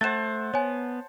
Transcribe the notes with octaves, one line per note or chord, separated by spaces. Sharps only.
A3 C5 F#5 A5 A6 E7
B3 C#5 G#5